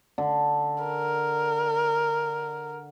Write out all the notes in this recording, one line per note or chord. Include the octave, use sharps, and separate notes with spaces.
D3
A#4